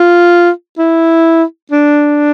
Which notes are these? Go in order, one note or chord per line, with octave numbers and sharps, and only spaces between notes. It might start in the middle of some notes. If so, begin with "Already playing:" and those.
Already playing: F4
E4
D4